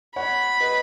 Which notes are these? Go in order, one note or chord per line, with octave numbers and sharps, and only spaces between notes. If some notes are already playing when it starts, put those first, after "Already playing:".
C#5 F#5 B5
B4 D#5